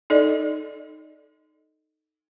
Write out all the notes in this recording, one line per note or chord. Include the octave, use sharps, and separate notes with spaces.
D#4 A4 D5 D#5